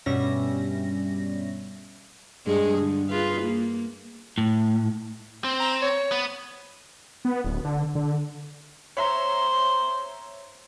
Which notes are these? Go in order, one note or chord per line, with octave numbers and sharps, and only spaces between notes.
G2 B2 G3 C#4 E5 A#6
G2 G#3 G#4
D3
F4 G#4 B4
A#3
A2
C4
A#5
C#5
B3
B3
D1
D3
D3
C5 C#5 E5 A#5 C6